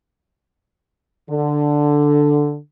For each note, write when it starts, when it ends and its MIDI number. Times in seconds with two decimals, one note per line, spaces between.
1.29 2.56 50